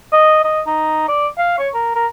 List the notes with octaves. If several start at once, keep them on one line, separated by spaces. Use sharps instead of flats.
D#5
D#5
D#4
D5
F5
C#5
A#4
A#4